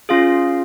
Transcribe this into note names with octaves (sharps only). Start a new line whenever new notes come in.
C#4 F4 G#4 F5